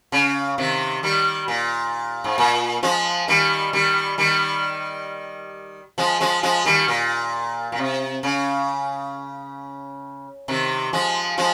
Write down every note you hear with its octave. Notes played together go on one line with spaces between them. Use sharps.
C#3
C3 D#3
D#3 G3
A#2
G#2
A#2
F3 G#3
D#3 G3
D#3 G3
D#3 G3
F3 G#3
F3 G#3
F3 G#3
D#3 G3
A#2
A#2
C3
C#3
C3 D#3
F3 G#3
F3 G#3